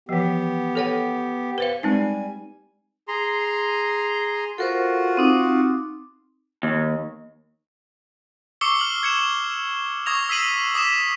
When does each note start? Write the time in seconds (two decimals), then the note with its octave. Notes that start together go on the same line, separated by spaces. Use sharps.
0.09 E3 F3 B3 G4
0.75 A4 C#5 F#5
1.58 B4 C5 F5
1.83 G3 G#3 C4 D#4 G#5
3.08 G#4 A#5 C6
4.58 F4 F#4 A4 A#4 C5
5.17 C4 D#4 D6
6.63 D#2
8.61 C#6 D6 E6 C7 C#7 G7
8.79 F6 F#7 G7
9.03 G#6 C#7 E7
10.06 C#6 D#6 G#6 A#6 F7
10.29 E6 B6 C7 D#7 F#7
10.74 D6 D#6 B6 E7